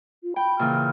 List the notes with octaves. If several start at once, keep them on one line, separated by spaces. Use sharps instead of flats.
F4
G5 B5
A#2 C#3 E3 F6